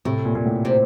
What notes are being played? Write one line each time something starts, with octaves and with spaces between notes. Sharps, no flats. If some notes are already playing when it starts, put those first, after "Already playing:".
A2 C3
A#2
A#2
A2
C3